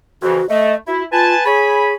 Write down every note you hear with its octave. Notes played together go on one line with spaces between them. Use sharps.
F2 C#3 E3 F#4
A3 D#5
E4 F#4
F4 B4 G#5 A5
G#4 C#5 G#5 B5